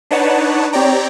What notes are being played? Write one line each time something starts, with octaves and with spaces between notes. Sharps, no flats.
D4 D#4 B4 C#5 F#5 A5
C4 G4 C#5 D5 G5 A#5